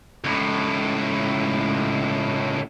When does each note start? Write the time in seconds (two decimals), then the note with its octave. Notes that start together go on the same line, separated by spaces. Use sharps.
0.24 C#2 A2